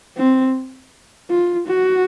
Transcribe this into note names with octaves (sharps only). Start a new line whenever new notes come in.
C4
F4
F#4